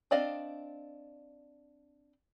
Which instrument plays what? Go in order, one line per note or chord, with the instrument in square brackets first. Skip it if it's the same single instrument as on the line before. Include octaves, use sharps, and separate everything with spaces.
[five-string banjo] C4 D4 D5 D#5 F5